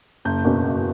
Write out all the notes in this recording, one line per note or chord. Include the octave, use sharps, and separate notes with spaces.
F#1 G6
E2 B2 A#3 C#4
F#1